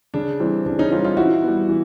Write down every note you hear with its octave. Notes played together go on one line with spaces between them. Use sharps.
C#3 D4
E3 G3 C4
C#3 D4
C#4 D#4
E3 G3 C4 D#4 F4
D#4 F4
E3 E4 F#4
G3 B3
E3